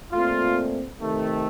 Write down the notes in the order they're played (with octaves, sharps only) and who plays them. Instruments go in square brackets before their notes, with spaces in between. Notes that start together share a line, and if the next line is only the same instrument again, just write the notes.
[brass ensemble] A#2 A3 C4 F4
C3 D#3 A3